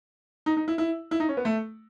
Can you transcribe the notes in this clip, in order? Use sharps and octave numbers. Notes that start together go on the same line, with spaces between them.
D#4
D#4
E4
E4
E4
D#4
C#4
B3
A3